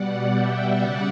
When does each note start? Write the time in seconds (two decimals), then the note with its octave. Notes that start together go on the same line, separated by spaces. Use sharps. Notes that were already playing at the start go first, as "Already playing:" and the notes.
Already playing: B2 G3 D5 F#5
0.33 E5 G5
0.79 C#3 G3 D5 F#5